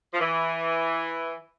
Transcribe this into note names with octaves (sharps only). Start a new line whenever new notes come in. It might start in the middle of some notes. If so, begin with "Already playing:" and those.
F3
E3